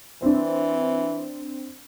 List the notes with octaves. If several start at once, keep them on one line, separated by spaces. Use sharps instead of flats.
E3 C4 D4